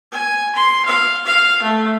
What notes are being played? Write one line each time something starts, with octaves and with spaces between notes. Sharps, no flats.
G#5
C6
F5
F5
A3